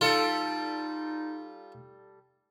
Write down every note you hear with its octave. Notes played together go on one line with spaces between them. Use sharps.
G3 D#4 F4 A4